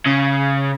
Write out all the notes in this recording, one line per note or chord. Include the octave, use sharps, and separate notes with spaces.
C#3